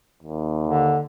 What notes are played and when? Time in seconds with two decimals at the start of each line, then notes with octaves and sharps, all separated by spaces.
0.23 D#2
0.68 D3